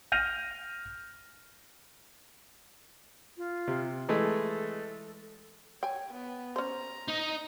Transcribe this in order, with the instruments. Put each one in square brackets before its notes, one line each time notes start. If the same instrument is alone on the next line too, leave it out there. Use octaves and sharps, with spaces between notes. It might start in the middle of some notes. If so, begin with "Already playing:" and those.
[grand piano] F6 G6 A#6 D#7 F7
[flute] F4
[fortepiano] C3
[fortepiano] E3 G#3 A3 [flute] A4
[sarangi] C#5 [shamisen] G5 G#5
[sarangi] B3
[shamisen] C#4 C5 [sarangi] A#5
[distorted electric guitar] D#4 D#5